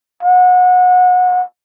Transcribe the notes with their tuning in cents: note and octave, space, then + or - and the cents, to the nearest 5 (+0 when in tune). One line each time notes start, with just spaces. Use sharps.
F#5 -30